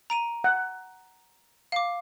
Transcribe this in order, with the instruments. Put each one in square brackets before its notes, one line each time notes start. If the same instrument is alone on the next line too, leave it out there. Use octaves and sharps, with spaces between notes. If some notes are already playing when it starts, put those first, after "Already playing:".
[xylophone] A#5 D7 D#7
[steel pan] F#5
[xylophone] F5 D6